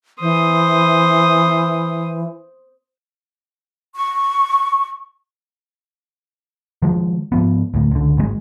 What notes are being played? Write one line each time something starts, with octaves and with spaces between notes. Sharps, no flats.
E3 C5 D#6
C#6
D#3 F3 G#3
G#2 F3 B3
D2 A2
C#2 D3
G#1 D#3 G#3